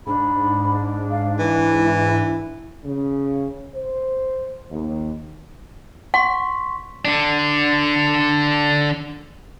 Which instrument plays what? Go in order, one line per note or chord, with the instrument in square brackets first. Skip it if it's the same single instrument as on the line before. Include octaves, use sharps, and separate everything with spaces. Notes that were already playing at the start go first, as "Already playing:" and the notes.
[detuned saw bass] G#2 [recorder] D4 [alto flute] B5
[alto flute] F5
[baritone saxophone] E3 [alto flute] E4
[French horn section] C#3
C5
D#2
[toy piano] F#5 [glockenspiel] C6 C#6 B6
[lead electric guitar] D3 D4